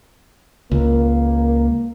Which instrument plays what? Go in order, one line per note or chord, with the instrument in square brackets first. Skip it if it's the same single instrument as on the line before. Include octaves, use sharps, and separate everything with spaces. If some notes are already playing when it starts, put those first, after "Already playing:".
[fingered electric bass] C#2 [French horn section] A#3